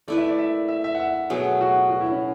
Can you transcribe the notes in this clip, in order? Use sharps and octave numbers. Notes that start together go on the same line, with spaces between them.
A3 E4 B4 D5
E5
D5
E5
E5
E5
F#5
E5
B2 F#3 A3 G#4
F#4
F#4
E4
C#4